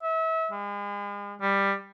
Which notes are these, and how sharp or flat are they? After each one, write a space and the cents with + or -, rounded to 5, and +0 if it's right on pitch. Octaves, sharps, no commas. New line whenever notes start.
E5 -30
G#3 -40
G3 +10